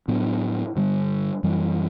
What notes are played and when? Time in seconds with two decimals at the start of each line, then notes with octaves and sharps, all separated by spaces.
0.08 A2 F#3 B3 D4
0.76 G2 D3 G3
1.43 F#2 E3 G3